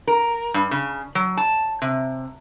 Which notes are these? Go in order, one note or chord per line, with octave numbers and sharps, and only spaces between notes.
A#4
G2
C#3
F#3
A5
C3